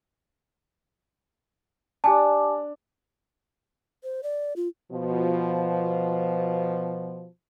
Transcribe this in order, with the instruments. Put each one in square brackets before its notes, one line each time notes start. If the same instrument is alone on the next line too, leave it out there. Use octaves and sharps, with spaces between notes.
[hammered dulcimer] D4 [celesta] G4 G#5 A5
[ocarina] C5
D5
F4
[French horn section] B2 F3